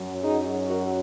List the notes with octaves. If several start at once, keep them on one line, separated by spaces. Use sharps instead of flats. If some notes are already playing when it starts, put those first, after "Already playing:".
Already playing: F#2 F#3
D#4 G#4
F#4 A#4